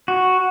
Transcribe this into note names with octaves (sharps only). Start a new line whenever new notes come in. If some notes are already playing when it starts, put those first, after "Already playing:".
F#4